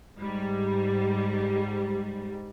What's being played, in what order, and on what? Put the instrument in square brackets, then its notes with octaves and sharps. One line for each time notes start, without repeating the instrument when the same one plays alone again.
[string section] G#2 G3